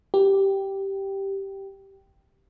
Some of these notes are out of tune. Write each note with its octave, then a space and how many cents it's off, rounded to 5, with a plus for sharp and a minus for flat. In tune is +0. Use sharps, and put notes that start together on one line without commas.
G4 -5